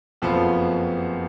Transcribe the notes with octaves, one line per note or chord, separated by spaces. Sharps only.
F#1 F2 F3 B3 F4